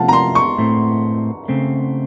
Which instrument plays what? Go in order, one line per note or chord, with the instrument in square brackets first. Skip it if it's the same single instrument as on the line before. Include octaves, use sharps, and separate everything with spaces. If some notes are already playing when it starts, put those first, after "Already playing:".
Already playing: [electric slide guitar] C3 F3 A3 C#4 F4 [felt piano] F#5 A5
[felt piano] A#5
C6
C#6
[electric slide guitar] A2 A3 C4
C#3 A3 C4